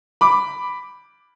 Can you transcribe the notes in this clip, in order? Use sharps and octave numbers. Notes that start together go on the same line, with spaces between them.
B5 D6